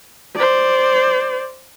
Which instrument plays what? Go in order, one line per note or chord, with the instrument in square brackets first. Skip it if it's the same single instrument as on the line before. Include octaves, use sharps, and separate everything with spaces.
[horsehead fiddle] C5 D5